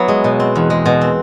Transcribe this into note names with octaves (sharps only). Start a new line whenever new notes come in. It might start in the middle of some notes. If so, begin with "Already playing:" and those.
Already playing: F#3 B3 E4
G#3
B2
C4
E2
G#3
B2
C4